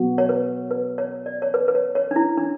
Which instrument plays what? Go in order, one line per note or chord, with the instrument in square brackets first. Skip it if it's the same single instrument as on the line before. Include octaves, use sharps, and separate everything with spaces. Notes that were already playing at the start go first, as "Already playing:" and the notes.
Already playing: [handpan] F#3 B3 F#4
[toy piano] C#5
B4
B4
C#5
D5
C#5
B4
B4
C#5
C#5
D4
E4
D4